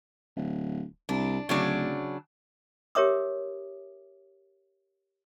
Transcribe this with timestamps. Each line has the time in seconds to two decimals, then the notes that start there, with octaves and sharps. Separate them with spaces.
0.36 D1
1.09 C2 D4
1.49 D1 C#3 F#3 D4
2.95 G4 A#4 C#5 E5 D6 D#6